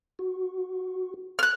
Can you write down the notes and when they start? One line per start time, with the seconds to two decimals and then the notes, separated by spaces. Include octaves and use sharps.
0.19 F#4
1.39 F6 F#6